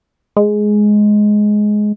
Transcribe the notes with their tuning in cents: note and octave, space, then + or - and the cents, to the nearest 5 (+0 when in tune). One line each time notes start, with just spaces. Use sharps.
G#3 +10